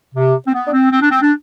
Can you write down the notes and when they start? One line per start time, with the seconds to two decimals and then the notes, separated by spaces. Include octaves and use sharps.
0.15 C3
0.47 C4
0.53 B3
0.67 D4
0.72 C4
0.91 C4
1.01 D4
1.10 C4
1.22 D4